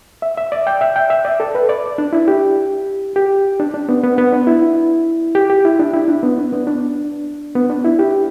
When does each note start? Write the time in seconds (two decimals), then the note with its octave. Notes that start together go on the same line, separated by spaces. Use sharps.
0.22 E5
0.37 E5
0.52 D5
0.67 G5
0.81 E5
0.96 G5
1.10 E5
1.25 D5
1.40 A4
1.55 B4
1.69 D5
1.98 D4
2.13 E4
2.28 G4
3.16 G4
3.60 D4
3.74 D4
3.89 B3
4.04 B3
4.18 B3
4.33 D4
4.47 E4
5.35 G4
5.50 G4
5.65 E4
5.79 D4
5.94 E4
6.08 D4
6.23 B3
6.38 D4
6.53 B3
6.67 D4
7.55 B3
7.70 D4
7.84 E4
7.99 G4